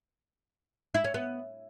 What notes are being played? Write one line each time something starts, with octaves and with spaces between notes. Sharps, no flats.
E4
C#4
B3